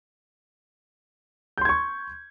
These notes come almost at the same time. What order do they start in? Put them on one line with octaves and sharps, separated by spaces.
G6 C6 G#6 C#6